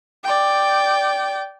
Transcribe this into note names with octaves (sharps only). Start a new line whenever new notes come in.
D5 G5